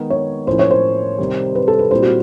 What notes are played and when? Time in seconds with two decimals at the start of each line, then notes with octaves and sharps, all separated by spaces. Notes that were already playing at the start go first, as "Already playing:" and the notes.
Already playing: D#3 G#3 B3 D#4
0.10 C#5
0.47 A2 F3 A#3 C#4 E4 C5
0.59 C#5
0.71 C5
1.19 C3 D#3 G3
1.55 B4
1.68 A4
1.79 B4
1.90 A#2 G3 C4 E4 C5
2.02 F#4